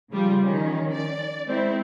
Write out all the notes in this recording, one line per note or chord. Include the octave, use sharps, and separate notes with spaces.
C#3 F3 G3 F4
D#3 C#4
D5
G#3 C4 E4